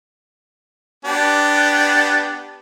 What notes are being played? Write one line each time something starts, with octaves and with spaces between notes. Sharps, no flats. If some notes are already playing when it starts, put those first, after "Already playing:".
B3 D4 G4